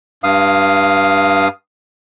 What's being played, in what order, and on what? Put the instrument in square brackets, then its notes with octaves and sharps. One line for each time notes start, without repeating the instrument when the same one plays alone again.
[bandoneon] G2 F5 D#6